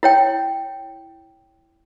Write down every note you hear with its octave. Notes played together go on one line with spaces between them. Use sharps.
E4 C#5 G5